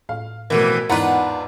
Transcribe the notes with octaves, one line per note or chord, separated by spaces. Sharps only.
A2 F5
F2 B2 D3 E3 A3 A#4
E2 G#2 D4 F4 B4 F#5 A#5